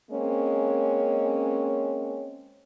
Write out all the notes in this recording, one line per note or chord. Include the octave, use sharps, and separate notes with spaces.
G#3 A#3 C4 C#4